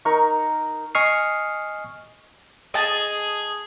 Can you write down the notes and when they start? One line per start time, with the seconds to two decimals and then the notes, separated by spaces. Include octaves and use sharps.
0.05 D#4 A#4 C#6
0.95 D#5 G#5 C#6 D#6 F6 C7
2.74 G#4 D#5 A5